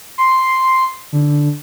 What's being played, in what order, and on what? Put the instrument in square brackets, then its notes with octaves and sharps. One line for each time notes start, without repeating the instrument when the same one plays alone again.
[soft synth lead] C6
D3